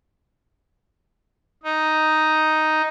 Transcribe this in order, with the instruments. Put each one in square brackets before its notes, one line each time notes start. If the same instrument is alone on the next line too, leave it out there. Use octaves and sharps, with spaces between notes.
[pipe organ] D#4